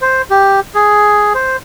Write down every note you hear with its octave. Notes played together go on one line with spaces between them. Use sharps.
C5
G4
G#4
C5